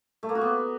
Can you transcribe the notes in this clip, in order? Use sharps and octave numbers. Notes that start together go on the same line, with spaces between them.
A3
A#3
F#4
B3